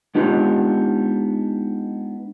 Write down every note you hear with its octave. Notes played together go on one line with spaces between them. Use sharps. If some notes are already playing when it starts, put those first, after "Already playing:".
G#3 B3 D4 D#4 F4 G4